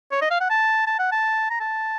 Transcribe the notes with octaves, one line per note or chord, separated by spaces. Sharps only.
C#5
D#5
F5
F#5
A5
A5
F#5
A5
A#5
A5